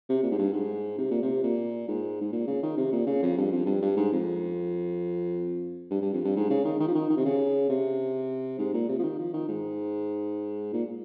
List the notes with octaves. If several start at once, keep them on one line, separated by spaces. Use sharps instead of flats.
C3
A#2
G#2
G2
G#2
C3
A#2
C3
A#2
G#2
G#2
A#2
C#3
D#3
C3
A#2
C#3
F2
G2
F2
G2
G2
G#2
F2
G2
G2
F2
G2
G#2
C#3
D#3
D#3
F3
D#3
D#3
C3
C#3
C3
G#2
A#2
C3
F3
D#3
F3
D#3
G#2
A#2